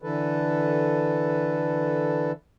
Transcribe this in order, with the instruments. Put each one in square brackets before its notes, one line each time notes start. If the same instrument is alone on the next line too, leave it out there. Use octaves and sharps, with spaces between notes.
[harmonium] D3 E3 A4 B4